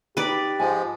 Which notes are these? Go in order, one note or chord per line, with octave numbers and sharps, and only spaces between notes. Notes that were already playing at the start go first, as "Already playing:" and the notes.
D#4 G4 B4 D5
G#2 F3 G#3 G#5